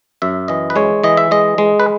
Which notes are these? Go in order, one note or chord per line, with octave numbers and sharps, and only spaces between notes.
F#2 E5
E3 D#5
B4
G#3 C#5
E3 D#5
E5
G#3 D#5
G#3
B4